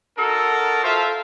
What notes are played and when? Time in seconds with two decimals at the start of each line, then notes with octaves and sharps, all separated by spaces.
0.18 D#4 F#4 A4 A#4 A5
0.84 F4 A4 C5 E5 F5